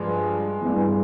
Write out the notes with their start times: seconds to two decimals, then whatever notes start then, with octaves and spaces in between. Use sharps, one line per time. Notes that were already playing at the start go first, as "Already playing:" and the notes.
Already playing: G2 F3 G#3
0.62 G2 E3